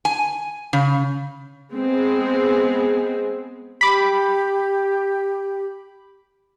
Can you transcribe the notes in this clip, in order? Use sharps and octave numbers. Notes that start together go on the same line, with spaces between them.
G#5
C#3
G#3 B3 C4 G#4
G4 B5 D6